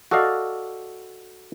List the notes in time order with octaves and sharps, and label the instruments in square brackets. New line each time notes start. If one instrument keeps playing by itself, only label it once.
[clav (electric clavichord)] F#4 A4 D5 D#5 F5